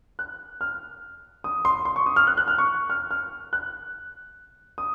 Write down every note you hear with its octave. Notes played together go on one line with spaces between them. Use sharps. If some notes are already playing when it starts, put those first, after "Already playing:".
F#6
F6
D#6
C6
C6
C#6
D#6
F6
F#6
F#6
F6
C#6
F6
F6
F#6
D#6